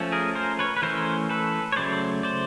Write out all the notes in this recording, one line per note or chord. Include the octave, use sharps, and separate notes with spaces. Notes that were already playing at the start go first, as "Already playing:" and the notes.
Already playing: F3 A3 C#4
G#4 A#4
A#4 C5
B4 C#5
B4
E3 A3 C#4 A#4 C5
A4 B4
C#5
C#3 F#3 A3 C5 D5
C5 D5